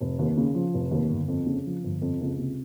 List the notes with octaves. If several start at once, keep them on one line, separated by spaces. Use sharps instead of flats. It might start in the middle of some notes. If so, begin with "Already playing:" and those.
F1
D#2
C#3
F3
F1
D#2
G1
F2
C#3
F3
G1
F2
C#2
C3